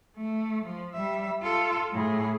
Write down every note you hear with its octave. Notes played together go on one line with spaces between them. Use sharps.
A3
F3
G3 E5
F4 A4
A2 G#4